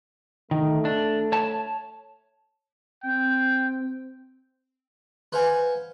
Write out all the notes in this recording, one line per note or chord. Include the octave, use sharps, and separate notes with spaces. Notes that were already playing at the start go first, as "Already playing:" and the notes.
D#3 A3
D4
C#5 A5
C4 G5
B4 C5 F5 F#5 G#5